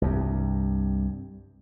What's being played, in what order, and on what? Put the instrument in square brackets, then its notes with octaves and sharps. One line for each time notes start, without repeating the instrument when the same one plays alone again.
[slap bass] C2 G2